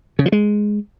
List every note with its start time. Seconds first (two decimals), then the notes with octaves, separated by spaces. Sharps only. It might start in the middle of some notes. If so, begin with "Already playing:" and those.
0.19 C#3
0.26 F3
0.32 G#3